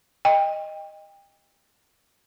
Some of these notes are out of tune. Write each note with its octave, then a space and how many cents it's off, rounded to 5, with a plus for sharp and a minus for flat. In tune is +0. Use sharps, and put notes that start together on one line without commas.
D#5 -5 G5 +30